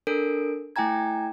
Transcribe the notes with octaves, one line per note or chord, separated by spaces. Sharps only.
D4 A4 A#4 D7
A3 E4 G5 G#5 A#5 G#6